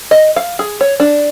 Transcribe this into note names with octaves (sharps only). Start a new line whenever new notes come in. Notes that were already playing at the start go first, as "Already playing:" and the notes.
D#5
F5
G#4
C#5
D4